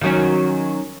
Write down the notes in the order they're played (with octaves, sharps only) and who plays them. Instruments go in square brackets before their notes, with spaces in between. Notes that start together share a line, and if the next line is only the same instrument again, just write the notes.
[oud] D#3 F#3 C#4